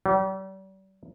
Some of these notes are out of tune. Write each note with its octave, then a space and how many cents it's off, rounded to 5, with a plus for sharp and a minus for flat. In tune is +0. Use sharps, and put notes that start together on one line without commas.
G3 -40